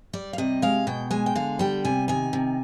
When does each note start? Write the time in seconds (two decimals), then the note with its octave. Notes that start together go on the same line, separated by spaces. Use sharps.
0.13 G3 D5
0.33 F5
0.38 C3 D#5
0.62 G#3 F5
0.87 B2 G5
1.11 G#3 G#5
1.26 G5
1.35 D3 F5
1.59 G3 G5
1.85 C3 G#5
2.08 D#3 G#5
2.33 C3